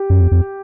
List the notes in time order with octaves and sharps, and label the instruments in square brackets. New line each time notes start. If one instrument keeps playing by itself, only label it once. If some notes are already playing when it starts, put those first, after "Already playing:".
Already playing: [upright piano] G4
[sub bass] F#2
F2
F2